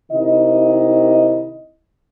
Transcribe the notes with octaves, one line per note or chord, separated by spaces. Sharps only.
C3 D#3 E4 D#5